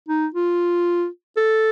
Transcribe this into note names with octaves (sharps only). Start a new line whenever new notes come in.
D#4
F4
A4